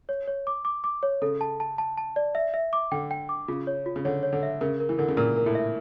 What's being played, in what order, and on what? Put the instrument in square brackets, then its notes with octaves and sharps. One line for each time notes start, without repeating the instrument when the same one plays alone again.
[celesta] C#5
C#5
D6
D6
D6
C#5
[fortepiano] C#3 [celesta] A4
[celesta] A5
A5
A5
A5
D5
E5
E5
D6
[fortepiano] D3 [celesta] G5
[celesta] G5
D6
[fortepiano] C#3 [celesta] F4
[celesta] C#5
F4
[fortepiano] C#3
[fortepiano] D3 [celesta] C#5
[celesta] C#5
[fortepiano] D3
[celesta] E5
[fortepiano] C#3 [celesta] A#4
[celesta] A#4
[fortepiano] E3
[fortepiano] D3 [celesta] A#4
[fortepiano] C#3
[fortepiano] A#2 [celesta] A#4
[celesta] A#4
[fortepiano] A2
[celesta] E5